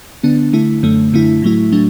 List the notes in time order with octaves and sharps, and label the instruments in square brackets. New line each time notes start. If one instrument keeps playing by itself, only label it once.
[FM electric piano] D3 B3 D4
D3 A3 E4
F#2 D3 A3
F#2 D3 A3 E4
A2 F#3 A3 E4
A2 F#3 A3 D4